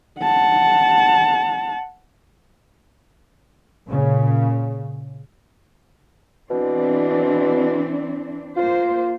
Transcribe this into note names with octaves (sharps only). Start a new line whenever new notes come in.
F#5 A5
A#2 C#3
B2 E3 C4 D4
A#3 F4 C5